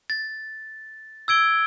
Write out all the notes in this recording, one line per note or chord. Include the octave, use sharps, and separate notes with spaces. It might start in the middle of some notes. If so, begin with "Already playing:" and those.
A6
E6 G#6 D7 G7